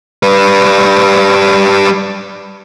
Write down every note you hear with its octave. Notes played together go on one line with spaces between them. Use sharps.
G3 B4